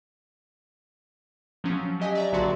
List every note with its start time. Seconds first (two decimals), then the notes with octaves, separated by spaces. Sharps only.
1.64 F3 F#3 C#4
2.00 F#3 G4 D#5 G#5 B6
2.15 D5 E5 A#5
2.32 A#1 D3 F#3 F#4 D5 C6